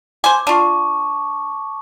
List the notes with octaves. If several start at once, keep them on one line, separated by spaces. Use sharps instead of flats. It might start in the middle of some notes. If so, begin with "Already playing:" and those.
C5 G#5 D6
D4 F4 A5 C#6